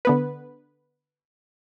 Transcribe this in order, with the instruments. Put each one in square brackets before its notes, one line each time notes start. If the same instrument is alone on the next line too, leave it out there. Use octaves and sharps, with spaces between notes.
[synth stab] D3 B3 B4